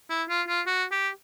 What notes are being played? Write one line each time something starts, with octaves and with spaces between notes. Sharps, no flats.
E4
F4
F4
F#4
G4